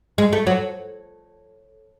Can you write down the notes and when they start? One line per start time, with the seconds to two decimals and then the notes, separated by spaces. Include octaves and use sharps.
0.18 G#3
0.33 A3
0.47 F#3